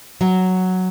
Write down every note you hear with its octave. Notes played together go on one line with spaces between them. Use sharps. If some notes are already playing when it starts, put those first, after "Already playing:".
F#3